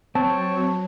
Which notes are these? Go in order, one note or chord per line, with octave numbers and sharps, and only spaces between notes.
F#3 C4 C#5 A5